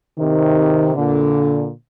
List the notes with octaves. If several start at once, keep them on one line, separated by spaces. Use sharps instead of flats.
C3 D#3
A#2 D3